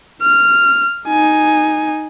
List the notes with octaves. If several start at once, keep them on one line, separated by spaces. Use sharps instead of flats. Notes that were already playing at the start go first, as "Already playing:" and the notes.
F6
D#4 G#5